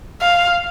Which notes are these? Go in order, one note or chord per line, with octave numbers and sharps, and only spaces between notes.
F5